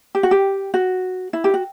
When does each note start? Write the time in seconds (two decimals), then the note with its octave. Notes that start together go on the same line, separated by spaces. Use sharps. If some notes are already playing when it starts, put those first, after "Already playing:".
0.15 G4
0.23 F#4
0.31 G4
0.74 F#4
1.33 E4
1.44 G4
1.54 F#4